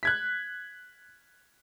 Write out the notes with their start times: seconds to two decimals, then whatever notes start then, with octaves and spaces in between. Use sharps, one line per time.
0.03 F#6 G#6 B6